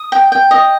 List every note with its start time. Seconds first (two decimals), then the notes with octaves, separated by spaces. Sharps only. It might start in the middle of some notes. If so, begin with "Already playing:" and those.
Already playing: D#6
0.12 G5
0.32 G5
0.51 D#5